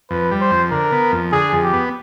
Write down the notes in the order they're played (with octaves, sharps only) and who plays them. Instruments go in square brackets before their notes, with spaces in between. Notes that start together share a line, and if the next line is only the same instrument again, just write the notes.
[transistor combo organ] F2 [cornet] B4
[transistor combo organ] G3
[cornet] C5
[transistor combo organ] F2
[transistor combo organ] D3 [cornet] A#4
[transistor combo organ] B3
F2
[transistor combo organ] D3 [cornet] G#4
[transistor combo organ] F2
[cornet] G4
[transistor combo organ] B3